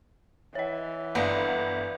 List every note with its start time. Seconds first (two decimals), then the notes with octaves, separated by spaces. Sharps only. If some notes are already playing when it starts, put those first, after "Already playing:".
0.55 E3 C#5 D#5
1.15 G1 B3 D5 F5 F#5